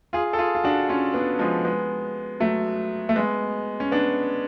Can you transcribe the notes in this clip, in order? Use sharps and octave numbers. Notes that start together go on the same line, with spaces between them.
F4 G#4
A4
F4 G#4
F4
D4 F#4
C#4 F4
B3 D4
F3 G#3
G#3 B3
F#3 A3
A3
G#3 B3
C#4
B3 D4